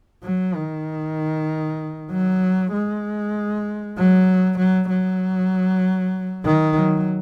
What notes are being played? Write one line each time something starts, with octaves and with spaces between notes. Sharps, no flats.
F#3
D#3
F#3
G#3
F#3
F#3
F#3
D#3
F#3